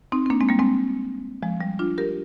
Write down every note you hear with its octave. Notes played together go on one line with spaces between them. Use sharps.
C4 D#4
C4
A#3 D4
G#3 C4
G3 A#3
G#3 C4
F3 G#3
G3
D4 F4
G4 A#4